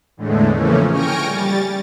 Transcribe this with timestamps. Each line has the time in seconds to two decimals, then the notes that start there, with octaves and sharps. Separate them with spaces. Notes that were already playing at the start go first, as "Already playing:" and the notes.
0.17 E2 A2 D3 G#3 A3
0.54 C#3 E3 F3 A3 A#3 C#4
0.89 G5 G#5 C#6 F6 A#6 D7
1.24 G3 A6